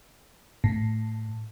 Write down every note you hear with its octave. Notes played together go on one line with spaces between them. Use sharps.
A2